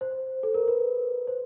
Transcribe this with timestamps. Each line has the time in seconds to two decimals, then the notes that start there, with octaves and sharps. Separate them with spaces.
0.01 C5
0.43 A4
0.54 A#4
0.68 B4
1.27 C5